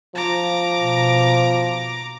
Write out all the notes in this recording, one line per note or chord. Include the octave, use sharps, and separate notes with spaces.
F3 A#5 D6
B2